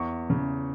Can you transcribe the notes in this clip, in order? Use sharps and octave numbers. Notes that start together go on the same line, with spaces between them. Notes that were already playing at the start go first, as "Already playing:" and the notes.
Already playing: E2 C#6
C#3